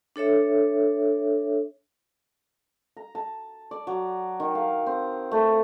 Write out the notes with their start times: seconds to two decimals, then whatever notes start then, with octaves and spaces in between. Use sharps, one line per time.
0.16 D4 A4 C#5 E5
2.97 A#5
3.15 A5
3.71 D5
3.87 F#3
4.40 D#3
4.55 F5
4.86 C4
5.31 A3